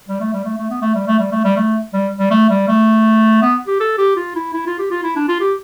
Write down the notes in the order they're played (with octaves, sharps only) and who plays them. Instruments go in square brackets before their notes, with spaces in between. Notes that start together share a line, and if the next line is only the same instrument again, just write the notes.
[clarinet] G3
A3
G3
A3
A3
B3
A3
G3
A3
G3
A3
G3
A3
G3
G3
A3
G3
A3
B3
G4
A4
G4
F4
E4
E4
F4
G4
F4
E4
D4
F4
G4